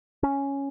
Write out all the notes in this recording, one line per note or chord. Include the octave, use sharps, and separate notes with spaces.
C#4